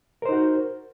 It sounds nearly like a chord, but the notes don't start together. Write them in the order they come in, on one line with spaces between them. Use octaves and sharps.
A#4 C5 D#4 F#4